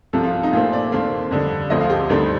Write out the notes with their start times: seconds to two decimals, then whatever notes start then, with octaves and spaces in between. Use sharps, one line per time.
0.13 C2 C3 F3 A4
0.23 F4
0.33 F4
0.43 D#4
0.52 A#2 A3 C4 F4
0.73 D5
0.92 D#2 D#3 A3 C4 F5
1.31 F2 D3 G3
1.70 D2 D3 F3 C4 D#5
1.81 F5
1.90 G4
2.01 G4
2.09 D2 D3 G3 C4 D#4